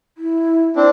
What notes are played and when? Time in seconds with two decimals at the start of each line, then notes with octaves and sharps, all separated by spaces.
0.18 E4
0.76 C4 D4 E4